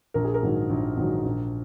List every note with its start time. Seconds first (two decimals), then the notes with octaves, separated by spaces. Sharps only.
0.14 A#1 A#4
0.24 G#4
0.34 A#4
0.43 G#2 D#3 F#3
0.70 A#1
0.97 G#2 D#3 F#3
1.25 A#1